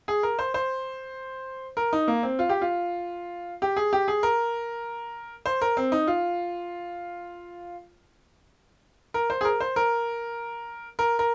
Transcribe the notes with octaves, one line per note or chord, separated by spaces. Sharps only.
G#4
A#4
C5
C5
A#4
D#4
A#3
C4
F4
G4
F4
G4
G#4
G4
G#4
A#4
C5
A#4
C4
D#4
F4
A#4
C5
G#4
A#4
C5
A#4
A#4
A#4